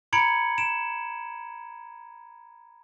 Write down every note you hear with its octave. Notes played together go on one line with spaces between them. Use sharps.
A#5 B5 G#6 C#7 D7 F#7
D7 E7